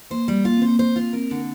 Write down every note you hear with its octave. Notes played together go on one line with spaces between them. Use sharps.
A#3 C5
G3
A#3 F4
C4 C5
A#3
C5
F4
C4 A#4
D3 D4